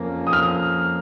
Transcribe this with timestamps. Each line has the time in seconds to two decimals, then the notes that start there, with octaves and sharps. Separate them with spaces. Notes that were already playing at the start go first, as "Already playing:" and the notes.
Already playing: F2 F3 A#3 C#4
0.27 D#6
0.33 F6